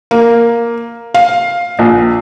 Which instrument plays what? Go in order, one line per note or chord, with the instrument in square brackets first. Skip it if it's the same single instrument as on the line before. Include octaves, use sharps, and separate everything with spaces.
[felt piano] A#3
F5
A#1